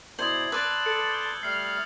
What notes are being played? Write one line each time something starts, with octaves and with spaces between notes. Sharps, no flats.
B2 E4 C5 D5 D#6 G#6 F#7
B4 D5 A5 C6 D6 E6
A4 A6 C#7
G6 G7
G3 A3 F6 C7